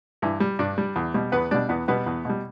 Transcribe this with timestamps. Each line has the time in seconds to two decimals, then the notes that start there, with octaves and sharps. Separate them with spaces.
0.22 G2 E3 E4
0.40 G3
0.59 G2 D4 D5
0.78 G3
0.96 E2
1.14 B2 G3
1.32 E2 B3 B4
1.51 B2 G3 D4 D5
1.69 E2 B3 B4
1.88 B2 G3 B3 B4
2.06 E2
2.25 B2 G3